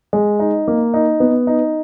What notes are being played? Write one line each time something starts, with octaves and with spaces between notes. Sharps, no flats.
G#3
D#4
A#3
D#4
B3
D#4